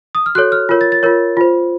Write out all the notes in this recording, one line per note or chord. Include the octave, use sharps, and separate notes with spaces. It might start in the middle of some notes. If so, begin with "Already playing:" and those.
D#6
F6
F#4 A4 C#5 F#6
F6
F4 A#4 C#5
A6
A6
F4 A#4 C#5
F4 C5